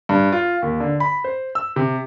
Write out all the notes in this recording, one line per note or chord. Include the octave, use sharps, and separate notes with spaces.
G2
F4
D#2
D3
B5
C5
E6
C3